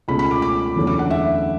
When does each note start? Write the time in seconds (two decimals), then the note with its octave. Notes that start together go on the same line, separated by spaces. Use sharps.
0.08 C#2 B2 A3 C#4 B5
0.19 B5
0.31 D6
0.42 D6
0.76 F#1 E2 D3 A3 C#4
0.87 D6
0.99 F#5
1.10 E5